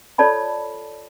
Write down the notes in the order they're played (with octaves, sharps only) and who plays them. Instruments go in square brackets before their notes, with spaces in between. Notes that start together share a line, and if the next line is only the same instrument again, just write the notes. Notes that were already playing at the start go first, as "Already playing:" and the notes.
[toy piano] F4 A4 C#5 D5 A5 B5